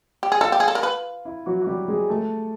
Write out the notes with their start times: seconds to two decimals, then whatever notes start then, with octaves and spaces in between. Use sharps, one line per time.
0.23 G4
0.32 G#4
0.41 F4 A4
0.52 G4
0.60 G#4
0.68 A4
0.75 A#4
0.83 B4
1.25 E4
1.46 F#3 F#4
1.62 F#4
1.67 G3 G4
1.88 G#3 G#4
2.10 A3 A4